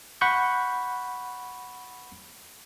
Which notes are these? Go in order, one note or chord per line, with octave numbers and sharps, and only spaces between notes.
F#5 B5 C#6 F#6 G6